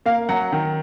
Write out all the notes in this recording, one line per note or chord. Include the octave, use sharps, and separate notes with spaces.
A#3 F5
F#3 F#5
D#3